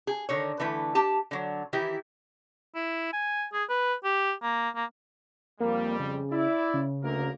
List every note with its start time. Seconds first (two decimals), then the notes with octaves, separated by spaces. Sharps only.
0.07 G#4
0.29 D3 D#3 C#5
0.59 D3 E3 A3 B4
0.95 G4 A5
1.31 D3 F#3
1.73 D#3 E3 E4 G4
2.75 E4
3.13 G#5
3.53 G#4
3.69 B4
4.04 G4
4.43 A#3
4.76 A#3
5.60 F2 G3 A#3
5.99 C#3
6.31 E4 D5
6.74 C#3
7.03 D2 A#3 A#4